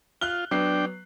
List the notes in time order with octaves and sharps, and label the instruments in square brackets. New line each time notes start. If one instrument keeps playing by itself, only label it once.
[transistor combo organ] F4 [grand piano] F6 F#6 G7
[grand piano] F#3 B3 C7 [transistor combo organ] D4 G5